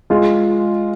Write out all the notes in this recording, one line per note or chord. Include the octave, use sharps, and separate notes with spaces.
G#3 F4